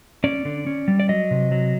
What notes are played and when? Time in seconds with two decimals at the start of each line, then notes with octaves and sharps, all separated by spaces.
0.24 C#4 D5
0.45 D3
0.67 C#4
0.88 G3
1.00 D5
1.09 F#3 D#5
1.31 C3
1.52 F#3